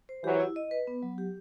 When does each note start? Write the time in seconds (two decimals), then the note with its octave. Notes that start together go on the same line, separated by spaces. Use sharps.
0.09 C5
0.24 E3 F#3 G4
0.40 E4
0.56 D#5
0.71 B4
0.87 B3
1.03 F#3
1.18 G4